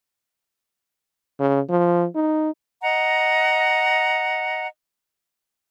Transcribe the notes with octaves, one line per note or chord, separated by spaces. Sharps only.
C#3
F3
D#4
D#5 F#5 A#5